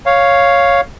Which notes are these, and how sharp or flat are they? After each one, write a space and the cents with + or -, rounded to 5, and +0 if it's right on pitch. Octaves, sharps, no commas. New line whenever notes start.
C#5 +0 F5 +0